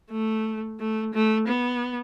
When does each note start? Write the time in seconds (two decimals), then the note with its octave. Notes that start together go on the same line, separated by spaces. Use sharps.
0.11 A3
0.80 A3
1.13 A3
1.48 B3